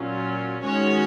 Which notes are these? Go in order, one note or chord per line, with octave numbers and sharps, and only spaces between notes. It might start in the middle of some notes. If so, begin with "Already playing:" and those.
Already playing: A#2 F#3 C#4 F4
D#3 G#3 C#4 F#4 C#5